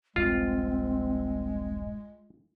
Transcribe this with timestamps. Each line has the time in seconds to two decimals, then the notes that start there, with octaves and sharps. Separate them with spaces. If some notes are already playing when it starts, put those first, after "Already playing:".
0.16 D#1 A#1 G2 G#3 C4 F4